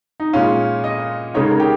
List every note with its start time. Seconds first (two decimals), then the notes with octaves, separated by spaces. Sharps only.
0.20 D#4
0.33 A#2 G#3 C#4 F4
0.84 D#5
1.34 C#3 G#3 D#4 C#5
1.51 A#4
1.60 G4